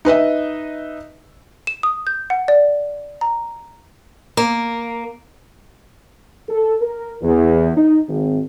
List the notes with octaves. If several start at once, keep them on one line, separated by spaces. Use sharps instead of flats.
D#4 B4 D#5 E5
E7
D#6
G6
F#5
D5
A#5
A#3
A4
A#4
E2
D#4
G#1